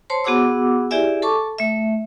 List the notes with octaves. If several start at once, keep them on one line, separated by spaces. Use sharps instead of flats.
C5 C#5 A5 C6
B3 F#4 G#4 F#5 D6 E6
E4 G4 G#4 D5 E5 G#5
A4 A5 C#6 D6
A3 E5